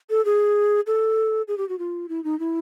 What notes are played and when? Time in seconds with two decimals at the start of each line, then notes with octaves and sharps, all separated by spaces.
0.10 A4
0.25 G#4
0.87 A4
1.48 G#4
1.58 G4
1.69 F#4
1.79 F4
2.09 E4
2.24 D#4
2.39 E4